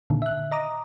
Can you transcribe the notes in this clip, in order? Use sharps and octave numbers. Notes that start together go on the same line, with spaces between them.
A#2 D3 D#3
E5 F#6
D#5 A#5 D6 D#6